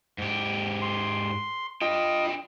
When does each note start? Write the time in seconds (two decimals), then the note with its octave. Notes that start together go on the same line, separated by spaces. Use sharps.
0.18 G#2 G4
0.82 C6
1.81 D4 F4 D#5 G5